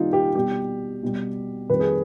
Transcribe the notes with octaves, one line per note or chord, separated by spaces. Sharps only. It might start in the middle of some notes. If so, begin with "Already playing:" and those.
Already playing: C3 D#3 G3 D#4 F4
G4
B2 G3 G4
B2 G3
F2 D#3 G3 B4
G#4